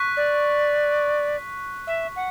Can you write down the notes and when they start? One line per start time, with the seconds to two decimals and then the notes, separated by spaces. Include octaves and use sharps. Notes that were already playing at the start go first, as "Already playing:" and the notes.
Already playing: C#6 F#6 B6
0.16 D5
1.87 E5
2.16 F#5